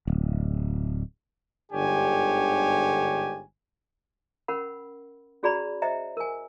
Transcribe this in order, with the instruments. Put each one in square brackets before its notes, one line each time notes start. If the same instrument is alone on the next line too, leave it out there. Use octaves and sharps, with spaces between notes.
[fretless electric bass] D1
[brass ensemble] G1 G#2 D3 G4 C#5 G#5
[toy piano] C#4 A#4 F#5 B5
C#4 F#4 G#4 D5 A#5 B5
C5 D#5 E5 G5 A#5
A#4 G#5